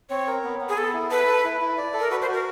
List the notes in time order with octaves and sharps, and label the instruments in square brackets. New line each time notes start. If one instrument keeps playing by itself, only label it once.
[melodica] C4 [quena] C#5
[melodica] A#4
B3
B3
[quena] G#4
[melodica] B3 [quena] A4
[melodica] E4
[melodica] A4 [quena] B4
[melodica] A4
E4
E4
D5
A4
[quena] A#4
[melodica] F#4 [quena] B4
[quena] C5
[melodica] F#4
[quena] A#4